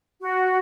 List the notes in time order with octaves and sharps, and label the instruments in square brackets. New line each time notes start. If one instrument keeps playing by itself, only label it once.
[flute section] F#4